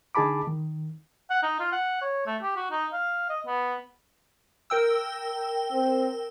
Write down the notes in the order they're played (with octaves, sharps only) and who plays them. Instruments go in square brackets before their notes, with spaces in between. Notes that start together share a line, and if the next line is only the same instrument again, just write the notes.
[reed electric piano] D3 D#4 G#4 A5 B5 D6
D#3
[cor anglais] F#5
D#4
F4
F#5
C#5
A3
G4
F#4
D#4
F5
D#5
B3
[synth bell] A#4 G5 E6
[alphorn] C4